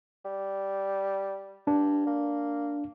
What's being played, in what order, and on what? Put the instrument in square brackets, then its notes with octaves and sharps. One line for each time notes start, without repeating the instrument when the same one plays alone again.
[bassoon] G3
[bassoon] G2 [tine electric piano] D4
[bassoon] A#3